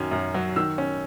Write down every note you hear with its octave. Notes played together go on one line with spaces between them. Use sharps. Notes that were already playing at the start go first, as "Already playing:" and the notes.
Already playing: F#2 D#3 F#3 C#4
F#2
F#3
D#3 E6
C#4